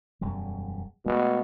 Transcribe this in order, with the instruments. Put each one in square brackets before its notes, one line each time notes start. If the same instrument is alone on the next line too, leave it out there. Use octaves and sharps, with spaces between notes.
[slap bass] E1 F#2 G3
[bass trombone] B2 [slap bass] G#3 A3